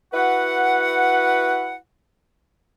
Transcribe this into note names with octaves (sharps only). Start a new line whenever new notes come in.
E4 F#4 B4 F#5